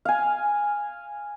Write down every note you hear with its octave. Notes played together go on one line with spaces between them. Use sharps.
F5 G#5